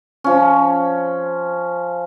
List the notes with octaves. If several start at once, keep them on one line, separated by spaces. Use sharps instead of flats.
F3 C#4